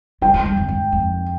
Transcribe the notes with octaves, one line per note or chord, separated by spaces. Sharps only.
G2 G5
G#2
G2
F2
G#2
F2